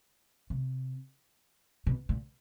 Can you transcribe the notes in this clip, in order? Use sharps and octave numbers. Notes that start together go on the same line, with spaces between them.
C3
B2
A#2